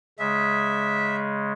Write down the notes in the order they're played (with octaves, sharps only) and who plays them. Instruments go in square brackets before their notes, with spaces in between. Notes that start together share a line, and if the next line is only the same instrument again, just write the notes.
[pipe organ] C#3 G#3 [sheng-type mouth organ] E5